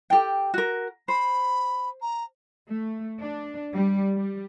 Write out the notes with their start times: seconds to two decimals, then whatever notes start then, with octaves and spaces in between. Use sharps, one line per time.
0.10 G4 A4 G5
0.54 F#4 A#4
1.08 C5 B5
2.02 A#5
2.67 A3
3.19 D4
3.73 G3
4.17 G3